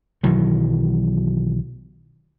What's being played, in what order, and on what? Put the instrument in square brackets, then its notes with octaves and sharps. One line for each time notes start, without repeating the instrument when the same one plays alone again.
[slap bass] B1 D#3 E3 F#3